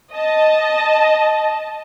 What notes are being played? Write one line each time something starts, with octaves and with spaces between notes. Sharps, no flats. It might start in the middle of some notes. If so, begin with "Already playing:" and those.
D#5 A5